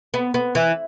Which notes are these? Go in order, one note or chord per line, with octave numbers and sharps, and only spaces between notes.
B3
B3
E3